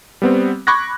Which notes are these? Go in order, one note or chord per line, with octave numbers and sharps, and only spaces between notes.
G3 B3 C4
B5 C#6 D6 F#6 G#6 A#6